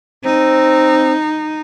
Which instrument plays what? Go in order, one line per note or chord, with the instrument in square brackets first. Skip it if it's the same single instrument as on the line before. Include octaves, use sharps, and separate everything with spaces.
[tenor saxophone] C4 [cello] D#4